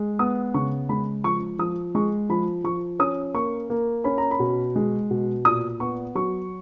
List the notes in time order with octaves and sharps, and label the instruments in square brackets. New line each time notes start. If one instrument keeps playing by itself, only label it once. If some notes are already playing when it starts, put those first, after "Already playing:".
Already playing: [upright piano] G#3
B3 D#6
C#3 C#6
G#3 B5
F3 C#6
F3 D#6
G#3 C#6
F3 B5
F3 C#6
C#4 D#6
A#3 C#6
A#3
C#4 B5
A#5
B5
B2
G#3
B2
A#2 D#6
B3 C#6
F#3 C#6